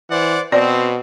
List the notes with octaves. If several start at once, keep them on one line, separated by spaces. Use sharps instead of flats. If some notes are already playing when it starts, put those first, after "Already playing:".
E3 C5 D5 F#5
B2 C4 D5